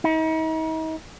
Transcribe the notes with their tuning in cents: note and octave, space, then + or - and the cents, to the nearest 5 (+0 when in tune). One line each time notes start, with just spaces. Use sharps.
D#4 +40